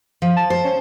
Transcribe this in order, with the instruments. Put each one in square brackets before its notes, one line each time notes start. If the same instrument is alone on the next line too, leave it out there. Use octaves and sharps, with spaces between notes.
[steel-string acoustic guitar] F3
[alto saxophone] A5
[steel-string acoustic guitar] C5
[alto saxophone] C#4